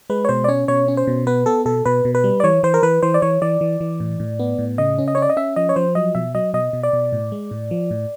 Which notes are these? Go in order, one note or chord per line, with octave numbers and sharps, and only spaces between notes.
G#3 B4
C#5
B2 C5
D5
C#4 C#5
B2 C#5
C#4
C5
B2
B3 B4
B3 A4
B2 A4
B2 B4
B2
B4
G3
D5
E3 C#5
E3 C5
A#4
E3 B4
E3 C5
D5
E3 C#5
E3 D5
E3
E3
A2
A2
B3
A2
C#3 D#5
C#4
D#5
C#4 C#5
D5
D#5
C#4 E5
F3 D#5
C#5
F3 C5
F#3 D#5
B2 E5
F#3 D#5
B2 D#5
B2
D5
B2
A2
G#3
A2
F3
A2